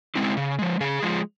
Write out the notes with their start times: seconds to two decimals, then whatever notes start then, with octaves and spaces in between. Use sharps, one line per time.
0.15 G#3 C4 E4
0.37 C#3
0.59 F3 G#3
0.80 C#3 G#4
1.03 F3 G#3